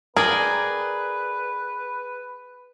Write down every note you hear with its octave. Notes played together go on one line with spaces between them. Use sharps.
G#4 A#4 B4 D5 G5